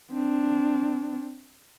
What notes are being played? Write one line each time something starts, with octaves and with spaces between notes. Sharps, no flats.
C4 D4